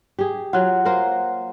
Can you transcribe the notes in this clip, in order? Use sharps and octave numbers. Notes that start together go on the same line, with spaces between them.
G4 G#4
F#3 F4 F#5 F#6
A#3 A#4 C5